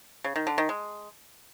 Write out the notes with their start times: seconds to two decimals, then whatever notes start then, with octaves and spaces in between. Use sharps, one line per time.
0.24 C#3
0.36 D#3
0.47 D3
0.58 D#3
0.69 G#3